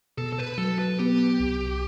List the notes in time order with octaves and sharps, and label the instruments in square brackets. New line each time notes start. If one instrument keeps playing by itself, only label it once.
[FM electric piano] B2 [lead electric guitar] A4
[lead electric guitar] A4
B4
[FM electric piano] F#3 [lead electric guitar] A4
[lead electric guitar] B4
[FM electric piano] B3 [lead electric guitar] G4
[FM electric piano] C2